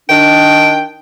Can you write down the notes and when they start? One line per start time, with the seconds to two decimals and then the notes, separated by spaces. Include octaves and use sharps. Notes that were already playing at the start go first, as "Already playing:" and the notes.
0.09 D#3 D4 G5